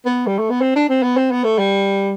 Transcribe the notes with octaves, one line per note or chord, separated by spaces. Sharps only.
B3
G3
A3
B3
C4
D4
C4
B3
C4
B3
A3
G3